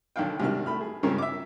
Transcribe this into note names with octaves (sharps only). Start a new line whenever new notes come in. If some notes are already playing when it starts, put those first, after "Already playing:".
B1 D3 D#3 F5 G5
C2 G#2 C3 D#3 D4 F6
A3 B5 F6
G#4
C#2 G2 C#3 C4 A#4
E5 D6